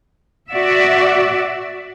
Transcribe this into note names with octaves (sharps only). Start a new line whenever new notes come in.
F#4 D5 E5